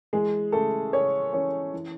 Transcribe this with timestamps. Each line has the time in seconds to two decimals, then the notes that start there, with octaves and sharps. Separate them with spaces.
0.13 E3 G#3 G#4
0.52 C#3 A3 A4
0.93 C#3 C#4 C#5
1.33 E3 C#4 C#5
1.73 E3